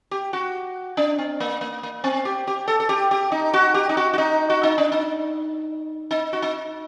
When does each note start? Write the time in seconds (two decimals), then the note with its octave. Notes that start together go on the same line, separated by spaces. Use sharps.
0.11 G4
0.33 F#4
0.97 D4
1.18 C4
1.40 A#3
1.61 A#3
1.83 A#3
2.04 C4
2.25 G4
2.47 G4
2.68 A4
2.80 A4
2.89 G4
3.11 G4
3.32 D#4
3.54 F#4
3.74 G4
3.89 D#4
3.97 F#4
4.13 F#4
4.18 D#4
4.50 F#4
4.63 D#4
4.78 D4
4.92 D#4
6.11 D#4
6.33 F#4
6.42 D#4